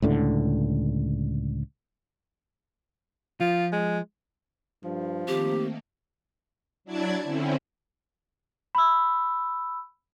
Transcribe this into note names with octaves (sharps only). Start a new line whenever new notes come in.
C#2 A2 D3
F3 F4
G#3
G2 F3
D#3 A3 A#3 C4 G4
F#3 D4 E4 D5 A5 G#6
D3 C4 C#4 E4
B5 E6